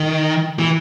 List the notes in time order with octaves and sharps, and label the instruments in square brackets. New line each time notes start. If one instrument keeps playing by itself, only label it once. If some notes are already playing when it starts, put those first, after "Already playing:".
Already playing: [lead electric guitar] D#3
E3